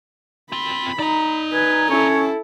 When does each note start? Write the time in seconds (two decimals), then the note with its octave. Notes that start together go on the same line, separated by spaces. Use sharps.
0.52 C4 F4 B5
0.99 D#4 D5 A#5
1.54 B4 G#5
1.90 C#4 E4 A4 C#5